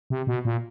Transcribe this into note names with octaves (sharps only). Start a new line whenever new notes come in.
C3
B2
A#2